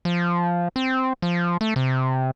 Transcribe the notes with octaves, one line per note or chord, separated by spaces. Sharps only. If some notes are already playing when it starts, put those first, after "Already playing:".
F3
C4
F3
A3
C3